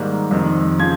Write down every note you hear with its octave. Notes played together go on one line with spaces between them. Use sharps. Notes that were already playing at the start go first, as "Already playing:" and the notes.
Already playing: G#2 D#3 G3 A#3
F2 C3 D#3
C#3 F3 G#6